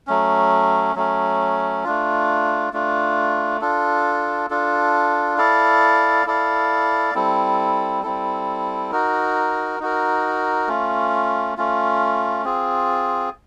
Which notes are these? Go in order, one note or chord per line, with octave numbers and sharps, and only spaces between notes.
F#3 A3 C#4
F#3 A3 C#4
A3 D4 F4
A3 D4 F4
D4 F4 A4
D4 F4 A4
E4 A4 D5 F5
E4 A4 D5 F5
G3 C4 E4 A4
G3 C4 E4 A4
D#4 F#4 A#4
D#4 F#4 A#4
A3 C#4 F4
A3 C#4 F4
C4 F4 G#4